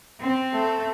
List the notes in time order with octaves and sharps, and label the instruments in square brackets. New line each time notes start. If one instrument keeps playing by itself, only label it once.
[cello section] C4
[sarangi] A3